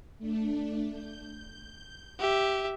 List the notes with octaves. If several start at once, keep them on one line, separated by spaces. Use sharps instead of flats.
A3 D4
G6
G4 E5